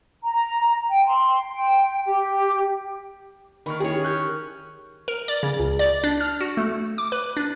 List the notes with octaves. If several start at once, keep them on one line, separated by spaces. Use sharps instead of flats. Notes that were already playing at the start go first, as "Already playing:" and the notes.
A#5
G5
C6
G5
G4
D#3 B5 C#6 F6
C#4 E4 G4 G#4 C#5
C#4 A#4 F#6 G6
A#4
D5
C#3
C#2
D5
D4
F6
F#4
A3
D6
B4
D4